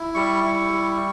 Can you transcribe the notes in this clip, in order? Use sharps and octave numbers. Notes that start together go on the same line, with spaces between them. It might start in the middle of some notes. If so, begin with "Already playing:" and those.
Already playing: E4
G3 C#6
E4
G3